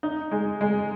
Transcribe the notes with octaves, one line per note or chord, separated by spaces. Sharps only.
D#4
G#3
G#3